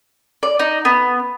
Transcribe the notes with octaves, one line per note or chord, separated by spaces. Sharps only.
D5
D#4
B3